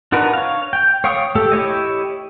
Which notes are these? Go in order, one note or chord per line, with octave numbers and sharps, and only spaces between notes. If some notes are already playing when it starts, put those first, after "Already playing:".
D4 D#4 F#4 A#4 B4
C#5 F5
G5
C#5 F5 G5 C#6 D#6
A3 G4 A4
E4 G4 C#5 D#5